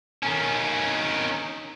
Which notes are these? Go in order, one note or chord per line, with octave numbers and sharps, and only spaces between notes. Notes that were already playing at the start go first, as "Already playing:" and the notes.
D#3 C#4